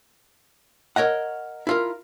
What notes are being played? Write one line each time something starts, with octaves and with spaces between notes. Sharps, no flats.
A#4 C#5 D#5 F#5
E4 F4 A#4